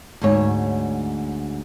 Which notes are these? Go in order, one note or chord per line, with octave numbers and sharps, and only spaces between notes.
D2 G#2 C#5